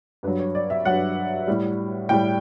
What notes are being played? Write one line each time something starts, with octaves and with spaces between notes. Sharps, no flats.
G2 F#3 B4
C#5
D5
E5
G2 F#3 F#5
A2 G3
A2 G3 G5